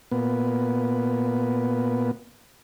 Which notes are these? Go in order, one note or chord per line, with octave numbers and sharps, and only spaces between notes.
A#2 B3